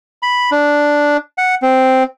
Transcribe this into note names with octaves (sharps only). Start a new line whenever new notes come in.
B5
D4
F#5
C4